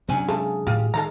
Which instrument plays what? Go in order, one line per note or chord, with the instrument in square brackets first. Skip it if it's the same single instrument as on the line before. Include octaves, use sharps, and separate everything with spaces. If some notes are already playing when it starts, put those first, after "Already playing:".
[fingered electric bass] C3 D4 [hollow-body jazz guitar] F#3 C#4 G#5
[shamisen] C#3 A3 [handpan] G#4
[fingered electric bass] A2 D#3 [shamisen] F4 G4
[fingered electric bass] D#3 [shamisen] G#3 A4 A#5